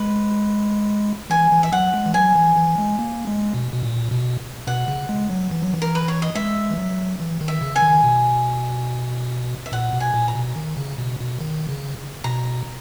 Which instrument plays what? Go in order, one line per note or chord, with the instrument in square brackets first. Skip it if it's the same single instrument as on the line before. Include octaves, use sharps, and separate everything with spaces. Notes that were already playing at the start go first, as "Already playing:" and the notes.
Already playing: [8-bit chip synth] G#3 [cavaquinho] B4
[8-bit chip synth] E3 [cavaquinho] G#5
[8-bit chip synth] E3
[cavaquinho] E5
[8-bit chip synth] F#3 [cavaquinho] F#5
[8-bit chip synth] G#3
E3
[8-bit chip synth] F#3 [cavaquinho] G#5
[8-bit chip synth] E3
E3
G#3
A#3
G#3
B2
B2
A#2
B2
[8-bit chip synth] B2 [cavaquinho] F#5
[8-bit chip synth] C#3
G#3
F#3
E3
F#3
E3
[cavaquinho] A#4
B4
C#5
D#5
[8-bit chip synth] G#3 [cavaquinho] E5
[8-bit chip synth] E3
F#3
E3
D#3
[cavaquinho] E5
[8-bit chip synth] C#3
[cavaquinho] G#5
[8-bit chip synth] D#3
B2
[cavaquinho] E5
[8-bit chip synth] A#2 [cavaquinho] F#5
[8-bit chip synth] B2
[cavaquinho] G#5
[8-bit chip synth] A#2
[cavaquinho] A#5
[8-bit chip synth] B2
D#3
C#3
B2
B2
D#3
C#3
[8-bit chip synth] B2 [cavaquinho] A#5